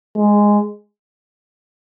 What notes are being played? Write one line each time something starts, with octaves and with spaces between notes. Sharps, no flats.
G#3